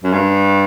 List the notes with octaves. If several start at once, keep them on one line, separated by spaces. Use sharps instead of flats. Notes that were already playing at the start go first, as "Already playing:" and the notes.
F#2
G2